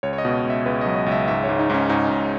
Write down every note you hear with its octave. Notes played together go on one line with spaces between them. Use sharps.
C#2 C#5
C#5
D#5
B2
D#5
C#2
E5
C#2 B4
F#3 D#5
D#5
C#2
E5
G#2 E5
C#5
G#2
D#4
G#2 C#4
G#2 D#4
G#2